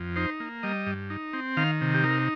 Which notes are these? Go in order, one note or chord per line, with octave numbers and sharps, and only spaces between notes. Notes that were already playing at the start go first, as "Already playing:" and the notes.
Already playing: F2
D#4 C5
A#3
G3 D#5
G2
D#4
C4
D#3 F5
C3
G4
D#4 A#4